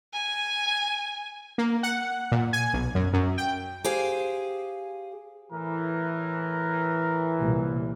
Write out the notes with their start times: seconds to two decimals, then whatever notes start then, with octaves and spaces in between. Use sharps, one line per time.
0.14 G#5
1.58 A#3
1.83 F#5
2.32 A#2
2.53 G#5
2.73 B1
2.95 F#2
3.13 F#2
3.38 G5
3.84 G4 G#4 C5 F5 G#5
5.52 A2 E3 A#4
7.38 C2 A#2